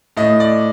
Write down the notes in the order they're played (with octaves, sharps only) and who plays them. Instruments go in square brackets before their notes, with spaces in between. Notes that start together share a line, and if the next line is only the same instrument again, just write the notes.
[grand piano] A2 D#5
D5